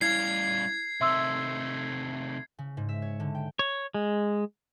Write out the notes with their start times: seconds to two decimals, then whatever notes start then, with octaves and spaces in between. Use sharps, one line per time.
0.01 G3 C#4 E4 F5 G#6 C7
1.01 C3 D#3 A3 E5 C6 E6
2.59 C#3
2.77 G#2
2.89 E5
3.02 C#5
3.20 D3
3.35 G5
3.59 C#5
3.94 G#3